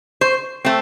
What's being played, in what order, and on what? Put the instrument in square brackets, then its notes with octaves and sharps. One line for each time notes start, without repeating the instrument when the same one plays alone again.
[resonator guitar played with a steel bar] C5
A3 C4